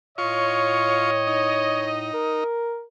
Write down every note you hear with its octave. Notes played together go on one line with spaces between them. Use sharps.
A2 F4 C#5 D#5 C#6
D#4
A#4